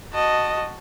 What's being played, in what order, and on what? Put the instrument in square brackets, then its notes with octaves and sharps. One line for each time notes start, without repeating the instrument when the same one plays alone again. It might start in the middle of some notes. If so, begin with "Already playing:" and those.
[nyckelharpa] F#4 A5 [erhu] D#5